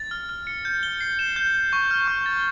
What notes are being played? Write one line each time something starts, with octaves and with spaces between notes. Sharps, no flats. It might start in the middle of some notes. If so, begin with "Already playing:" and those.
Already playing: A6
F6
F6
C#7
G6
G7
C7
E7
G6
G6
C#6
F6
C#6
A6